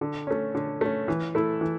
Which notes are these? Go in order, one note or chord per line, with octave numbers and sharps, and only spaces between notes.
D3
A3 C#4
D3
A3 C#4
E3
A3 E4 A4
E3